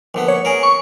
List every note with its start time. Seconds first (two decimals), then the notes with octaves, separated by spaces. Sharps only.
0.14 A#1 D3 B3
0.28 C#5
0.45 C#4 G#4 A#4
0.63 C#6